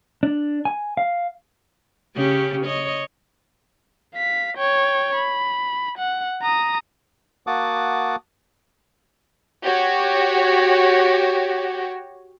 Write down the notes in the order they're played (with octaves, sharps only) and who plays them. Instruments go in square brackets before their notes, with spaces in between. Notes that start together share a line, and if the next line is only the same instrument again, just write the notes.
[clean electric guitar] D4
G#5
F5
[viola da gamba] C#3 C#4 G4
C#5 D#5
[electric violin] F5 B6
C#5 G5
B5
F#5
A#5 D#6
[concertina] A#3 F#4 F#5 A5 D6 D#6
[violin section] F#4 G4 C#5